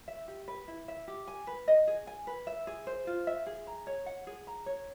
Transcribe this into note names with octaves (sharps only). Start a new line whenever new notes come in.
E5
G4
B4
E4
E5
G4
G#5
B4
D#5
G#4
G#5
B4
E5
G#4
C5
F4
E5
G#4
A#5
C#5
F#5
G#4
A#5
C#5